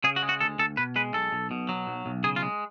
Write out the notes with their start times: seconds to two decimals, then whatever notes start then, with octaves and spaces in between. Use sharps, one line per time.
0.04 C#3 G#4
0.16 F#4
0.23 G#3
0.29 F#4
0.41 D2 A4
0.59 D2 A4
0.77 B2 B4
0.96 G#3 B4
1.14 B1 A4
1.32 B1
1.51 B2
1.69 F#3
1.87 B1
2.06 B1
2.24 C#3 G#4
2.36 F4
2.42 G#3